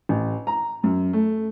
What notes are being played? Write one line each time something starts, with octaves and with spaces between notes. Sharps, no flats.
A1
A#5
F#2
A3